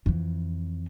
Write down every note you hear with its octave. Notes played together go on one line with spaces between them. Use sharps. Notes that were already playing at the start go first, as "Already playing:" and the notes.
F2 E3